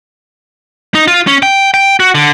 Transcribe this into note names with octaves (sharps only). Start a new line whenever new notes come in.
D#4
F4
C#4
G5
G5
F#4
D3